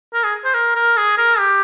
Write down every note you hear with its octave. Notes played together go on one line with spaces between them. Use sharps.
A#4
G#4
C5
A#4
A#4
G#4
A#4
G4